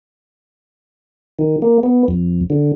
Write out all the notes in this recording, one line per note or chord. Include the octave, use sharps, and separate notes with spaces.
D#3
A#3
B3
F2
D3